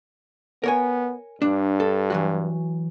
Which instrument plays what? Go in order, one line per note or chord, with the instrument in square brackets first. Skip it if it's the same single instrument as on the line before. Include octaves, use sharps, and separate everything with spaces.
[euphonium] B3 [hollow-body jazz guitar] A#4 C#5 G#5
[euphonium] G2 [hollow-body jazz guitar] D4
[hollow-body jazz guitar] A4
E3 F#3 F#4